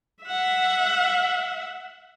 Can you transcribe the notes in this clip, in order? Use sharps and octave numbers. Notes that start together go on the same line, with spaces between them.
E5 F#5